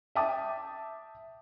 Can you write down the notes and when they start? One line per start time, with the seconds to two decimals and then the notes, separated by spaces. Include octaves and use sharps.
0.15 E5 G5 A5 D6 D#6